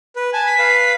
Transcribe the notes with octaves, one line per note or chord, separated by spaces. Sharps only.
B4
G#5 A5
B6
B4 F5